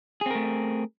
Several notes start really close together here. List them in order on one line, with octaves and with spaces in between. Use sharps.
G#4 C4 A#4 A3